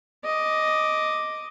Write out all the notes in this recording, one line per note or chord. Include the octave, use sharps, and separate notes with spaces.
D#5 D6